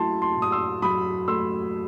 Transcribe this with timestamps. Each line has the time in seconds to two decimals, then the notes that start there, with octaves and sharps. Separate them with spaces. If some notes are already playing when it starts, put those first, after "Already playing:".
Already playing: F#3 A3 E4 A5 C6
0.22 A5 C6
0.36 A2
0.42 D#6
0.52 C6 E6
0.82 F#3 B5 D#6
1.28 A3 C6 E6